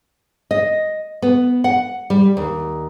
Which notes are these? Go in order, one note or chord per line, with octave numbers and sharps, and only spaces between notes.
D#5
B3
F#5
G3
D#2